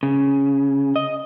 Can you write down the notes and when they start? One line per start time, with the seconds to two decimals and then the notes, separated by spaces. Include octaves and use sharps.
0.03 C#3
0.96 D#5